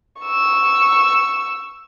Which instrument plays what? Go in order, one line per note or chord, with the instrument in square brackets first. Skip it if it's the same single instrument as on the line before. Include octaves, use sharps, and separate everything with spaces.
[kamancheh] C#6 E6